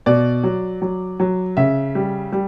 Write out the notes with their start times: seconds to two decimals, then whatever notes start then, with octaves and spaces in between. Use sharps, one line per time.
0.06 B2 D5
0.43 F#3
0.82 F#3
1.20 F#3
1.57 C#3 E5
1.95 G3
2.32 G3